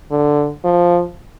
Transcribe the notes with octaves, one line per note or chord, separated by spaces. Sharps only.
D3
F3